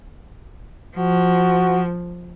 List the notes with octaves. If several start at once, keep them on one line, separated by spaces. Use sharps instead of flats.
F3 F#4